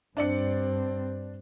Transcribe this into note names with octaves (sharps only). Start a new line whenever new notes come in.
G2 C4 D4 D5 C#7